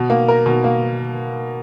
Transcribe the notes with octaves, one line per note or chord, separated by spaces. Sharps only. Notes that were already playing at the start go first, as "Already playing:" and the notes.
Already playing: B2
A#3
A#4
B2
A#3